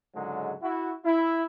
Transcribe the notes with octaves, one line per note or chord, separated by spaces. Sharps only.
C#2 G#2 D3 F#3 G#3
E4 F#4
E4